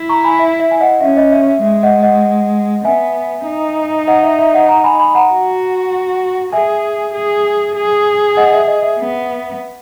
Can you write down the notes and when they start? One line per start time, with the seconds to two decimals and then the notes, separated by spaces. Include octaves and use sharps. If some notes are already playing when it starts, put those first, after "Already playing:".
Already playing: E4
0.09 A#5 C#6
0.24 G#5 B5
0.39 E5
0.60 E5
0.71 G#5
0.81 D#5 F#5
1.01 C#4 E5
1.17 D#5
1.32 E5
1.47 E5
1.62 G#3 E5
1.83 D#5 F#5
2.03 D#5 F#5
2.85 B3 E5 G#5
3.46 D#4
4.08 D#5 F#5
4.23 E5
4.39 E5
4.53 D#5 F#5
4.69 F#5 A#5
4.84 G#5 B5
5.00 G#5 B5
5.15 F#5 A#5
5.31 F#4
6.52 G#4 E5 G#5
7.14 G#4
7.75 G#4
8.37 D#5 F#5
8.53 E5
8.68 D#5
8.82 E5
8.98 B3